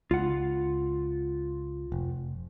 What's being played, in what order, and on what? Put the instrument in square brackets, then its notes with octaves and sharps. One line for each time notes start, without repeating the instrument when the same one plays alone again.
[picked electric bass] C#2 [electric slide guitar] F4 F#5
[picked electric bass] F1